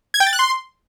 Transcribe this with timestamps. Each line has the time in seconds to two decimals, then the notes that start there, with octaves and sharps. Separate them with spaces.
0.14 G#6
0.20 G5
0.27 A6
0.33 F#6
0.39 C6